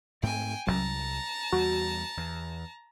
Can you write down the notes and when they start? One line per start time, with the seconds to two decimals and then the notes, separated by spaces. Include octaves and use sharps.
0.23 G#2 A3 C4 G5 G#5
0.67 D#1 C2 F#2 A5 A#5
1.52 E2 G3 F#4
2.17 E2